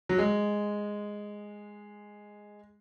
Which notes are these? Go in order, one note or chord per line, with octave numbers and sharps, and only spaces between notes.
F#3
G#3